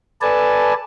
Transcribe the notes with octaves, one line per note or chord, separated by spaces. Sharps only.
A4 B4 D5 G#5 A5